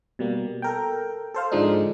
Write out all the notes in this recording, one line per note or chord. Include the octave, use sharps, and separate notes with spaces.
B2 G3 A#3
A4 A#4 G5
A4 C5 F5
G#2 D3 F3 G#3 D4 D#4